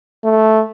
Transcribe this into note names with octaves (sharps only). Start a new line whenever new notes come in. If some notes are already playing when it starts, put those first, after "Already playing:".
A3